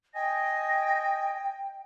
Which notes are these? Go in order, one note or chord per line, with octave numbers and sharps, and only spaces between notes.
D#5 G5 G#5 A#6